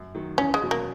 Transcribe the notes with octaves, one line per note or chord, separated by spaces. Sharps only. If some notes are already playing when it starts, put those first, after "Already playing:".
Already playing: F#2
D#3 F#3
E2 C#4
G#3
B2 F#3 C#4
A#3